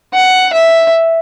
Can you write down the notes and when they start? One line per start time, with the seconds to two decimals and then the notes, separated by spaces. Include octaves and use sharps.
0.14 F#5
0.54 E5